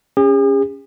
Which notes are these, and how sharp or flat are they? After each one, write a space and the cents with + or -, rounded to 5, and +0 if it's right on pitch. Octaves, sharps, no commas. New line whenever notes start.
C#4 +0 G#4 -45